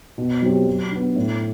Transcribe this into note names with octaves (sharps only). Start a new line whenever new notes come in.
B2
F#3 C4 G4
F#3
B3 D4
A2